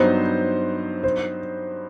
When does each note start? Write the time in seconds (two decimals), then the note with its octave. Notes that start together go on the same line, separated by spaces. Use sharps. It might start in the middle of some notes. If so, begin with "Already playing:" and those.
Already playing: G2 F#3 B3 D#4 C5
1.03 C5